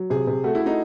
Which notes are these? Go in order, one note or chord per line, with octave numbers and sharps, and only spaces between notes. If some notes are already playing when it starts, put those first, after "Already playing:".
Already playing: F#3
C3 G#4
C3
A3 F#4
E4
A3
D#4